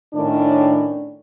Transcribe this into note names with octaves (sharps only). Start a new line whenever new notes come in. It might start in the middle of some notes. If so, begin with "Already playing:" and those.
A2 D#3 C#4 D4